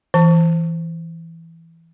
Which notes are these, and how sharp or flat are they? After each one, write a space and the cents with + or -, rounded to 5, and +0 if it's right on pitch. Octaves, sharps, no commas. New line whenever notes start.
E3 +0 A5 +20